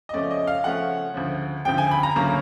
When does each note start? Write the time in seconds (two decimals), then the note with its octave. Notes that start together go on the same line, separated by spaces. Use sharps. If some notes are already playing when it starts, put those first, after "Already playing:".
0.09 D#5
0.13 C#3 F3 A3 C#4 D5
0.31 D#5
0.47 F5
0.64 C#3 F3 A3 C#4 F#5
1.14 D2 C#3 F3
1.65 D2 C#3 F3 G5
1.78 G#5
1.91 B5
2.03 A#5
2.15 D2 C#3 F#3 A#3 C#4 A#5